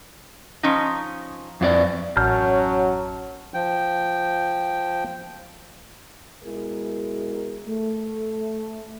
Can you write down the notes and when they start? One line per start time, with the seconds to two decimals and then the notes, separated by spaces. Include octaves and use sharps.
0.63 F3 C#4 D#4
1.61 F2 F4 D5
2.17 A1 F#2 F#3 C#4 A5 F6 G6
3.54 F3 G5
6.44 B2 G#3 E4 G#4 A#4
7.67 A3